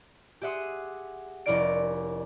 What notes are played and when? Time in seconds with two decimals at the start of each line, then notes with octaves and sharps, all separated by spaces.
0.42 G4 G#4 E5 F#5 C6 D#6
1.46 F1 C#4 E4 A#4 D5 D7